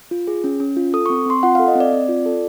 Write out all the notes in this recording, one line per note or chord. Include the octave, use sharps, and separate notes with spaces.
F4
G#4
C#4
C#4
F4
A4 D#6
C4 C#6
C4 C6
F4 F#5
A4 F5
D#5
C4 D5
C4
F4
A4